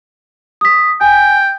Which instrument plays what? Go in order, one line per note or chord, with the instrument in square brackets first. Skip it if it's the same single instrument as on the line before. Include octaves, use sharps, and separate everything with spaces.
[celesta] D#6 B6
[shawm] G5 [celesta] G#5